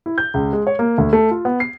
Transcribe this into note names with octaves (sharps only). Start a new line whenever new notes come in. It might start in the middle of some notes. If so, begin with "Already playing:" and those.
E4
G6
C#2
G#3
C#5
A#3
D2
A3
F4
B3
C7